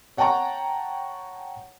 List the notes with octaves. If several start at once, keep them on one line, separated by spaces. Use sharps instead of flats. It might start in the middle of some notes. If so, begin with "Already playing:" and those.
C#5 F#5 G5 A5 A#5 C#6